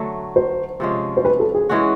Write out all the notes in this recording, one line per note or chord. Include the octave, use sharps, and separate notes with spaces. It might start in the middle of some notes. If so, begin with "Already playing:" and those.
Already playing: D3 F#3 A3
C5
C3 F3 G#3 C#4
C5
B4
A4
G#4
E3 G#3 C#4 F#4